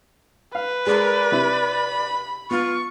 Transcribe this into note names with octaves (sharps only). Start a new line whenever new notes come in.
B4 F5
G#3 G#4 A#4 D5
C3 E4 B5
B3 F4 C#6